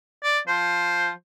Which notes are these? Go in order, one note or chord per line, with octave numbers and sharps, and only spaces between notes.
D5
F3 C5